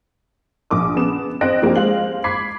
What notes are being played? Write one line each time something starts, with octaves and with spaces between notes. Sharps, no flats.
A#1 D6 D#6
C#3 B3 E7
C4 D#5 F#6 A#6 D7
F3 A#3 C4 D4 G4
G#3 C5 F5 F#7
B5 D6 G#6 B6 C7